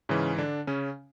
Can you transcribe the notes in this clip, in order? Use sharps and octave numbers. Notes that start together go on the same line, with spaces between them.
G#2 C#3 E3 C#4
D3 D4
C#3 C#4